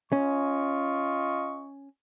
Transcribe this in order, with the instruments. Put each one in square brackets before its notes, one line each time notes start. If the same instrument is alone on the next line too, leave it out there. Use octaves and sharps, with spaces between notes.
[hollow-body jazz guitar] C#4 [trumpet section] F4 D#5 C#6